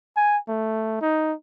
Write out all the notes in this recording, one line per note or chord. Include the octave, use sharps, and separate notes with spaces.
G#5
A3
D#4